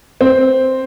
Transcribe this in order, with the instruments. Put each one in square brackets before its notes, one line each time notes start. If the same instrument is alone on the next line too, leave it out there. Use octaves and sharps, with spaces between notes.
[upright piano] C4